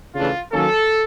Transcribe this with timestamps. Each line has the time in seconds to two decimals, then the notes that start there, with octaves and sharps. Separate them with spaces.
0.15 C#3 E3 A3 D4 F4
0.53 D#3 F#3 A#3 C#4 A4